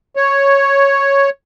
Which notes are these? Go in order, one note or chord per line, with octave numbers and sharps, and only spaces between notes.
C#5